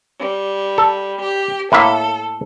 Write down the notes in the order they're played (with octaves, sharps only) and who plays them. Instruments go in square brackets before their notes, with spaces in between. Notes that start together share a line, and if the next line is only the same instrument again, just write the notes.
[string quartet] G3
[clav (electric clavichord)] A4
[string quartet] G4
[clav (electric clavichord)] A2 A#3 E5 [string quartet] A4